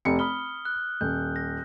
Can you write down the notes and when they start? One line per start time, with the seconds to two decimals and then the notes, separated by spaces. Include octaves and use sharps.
0.05 F1 G4 C#7
0.19 B5 D#6 F6 G7
0.65 F#6
1.01 D#1 G6
1.36 A#6